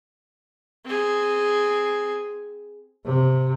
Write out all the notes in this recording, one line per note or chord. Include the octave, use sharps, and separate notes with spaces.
C4 G#4
C3